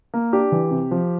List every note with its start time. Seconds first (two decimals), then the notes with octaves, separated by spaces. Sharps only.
0.14 A#3
0.33 D4 G4
0.52 E3
0.71 C3
0.91 F3